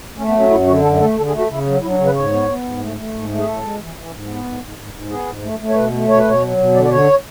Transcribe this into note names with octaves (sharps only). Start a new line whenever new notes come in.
A3 C#4
B3
F#3
C#4
F#2 E4
D3 F#4
F#2 A4
A3 A4
D3 A4
G#4
A3
F#4
C#3 E4
F#3
F#3 E4
D4
C#3 C#4
B4
G#2 C#5
B3
B3
G#2
A3
A3
G#2
A3
G#4
A2 A4
G#3
E3
E3
G#2
B3
G#2
G#2
G#2
G#2
B3 G#4
G#2
A3
A3
C#5
B2 B4
A3
B2 C#5
B4
B2 C#5
F#3
B2
D3 D5
D5
D3 C#5